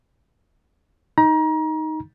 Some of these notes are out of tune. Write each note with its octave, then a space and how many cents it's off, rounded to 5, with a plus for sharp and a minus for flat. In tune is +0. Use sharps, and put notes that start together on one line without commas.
D#4 +5 A#5 +30